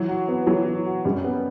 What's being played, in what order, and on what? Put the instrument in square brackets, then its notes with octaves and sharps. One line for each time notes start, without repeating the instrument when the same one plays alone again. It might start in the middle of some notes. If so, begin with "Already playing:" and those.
Already playing: [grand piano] E3 [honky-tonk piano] F#3
[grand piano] F#4
B3
[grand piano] E3 [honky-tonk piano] F#3
[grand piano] E3
F#4
[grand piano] F#2 [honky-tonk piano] G3
[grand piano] B3